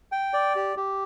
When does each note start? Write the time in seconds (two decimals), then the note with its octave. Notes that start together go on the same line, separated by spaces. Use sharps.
0.12 G5
0.34 D5
0.56 G4
0.77 G4